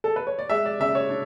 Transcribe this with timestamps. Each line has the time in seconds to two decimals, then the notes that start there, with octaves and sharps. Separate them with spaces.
0.04 A4
0.16 B4
0.27 C#5
0.39 D5
0.50 G#3 E5
0.66 D5
0.80 C#3 E5
0.95 C#5
1.10 D4